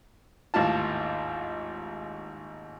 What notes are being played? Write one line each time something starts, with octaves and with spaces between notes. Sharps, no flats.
G#1 D#2 A2 F4 A5